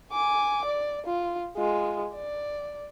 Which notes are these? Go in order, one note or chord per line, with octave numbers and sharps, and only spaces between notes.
G#5 D6
D5
F4
G#3 F4
D5